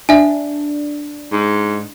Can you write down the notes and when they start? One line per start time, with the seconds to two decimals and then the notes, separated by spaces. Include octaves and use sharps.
0.09 D4 E5 G#5
1.32 G#2